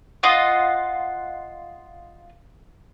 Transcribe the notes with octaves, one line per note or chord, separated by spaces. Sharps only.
F4 D#5 F#5